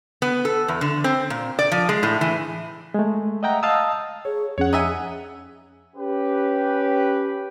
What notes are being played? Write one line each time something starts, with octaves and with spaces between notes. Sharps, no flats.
B3
A4
E2
D3
C4
A#2
D5
F3
G#3
A2
E3
G#3 A3
D#5 E5 F#5 G5 A#5
D#5 F5 A5 D#6 E6
G#4 C#5
F2 C#4 G#4 C#5 F#5
D#4 E5 G#5
C#4 G4 B4